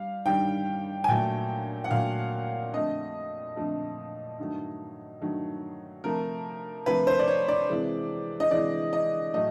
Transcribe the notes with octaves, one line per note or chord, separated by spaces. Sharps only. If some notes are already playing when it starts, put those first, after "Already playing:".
Already playing: G3 F5
G2 D#3 G3 G5
G#5
A#2 F#3 A3 G5
F#5
A#2 F#3 A3 F5
F2 D3 F3 A3 D#5
F2 D3 F3 A3
G2 D#3 F#3 A3
G2 D#3 F#3 A3
C3 F3 A3 A#4
C3 F3 A3 B4
C5
D5
C#5
D5
C3 E3 G#3
D#5
C3 E3 G#3 D5
D#5
A2 F#3 A3 D#5